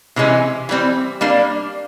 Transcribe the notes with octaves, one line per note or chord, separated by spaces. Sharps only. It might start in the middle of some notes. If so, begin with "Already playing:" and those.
C3 E3 G#3 C#4
E3 G3 C4
G3 A#3 D4